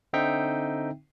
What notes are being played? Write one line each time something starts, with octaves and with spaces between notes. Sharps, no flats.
D3 C4 D#4 E5 G5